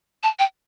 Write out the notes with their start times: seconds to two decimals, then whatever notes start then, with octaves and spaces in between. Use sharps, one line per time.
0.23 A5
0.39 G5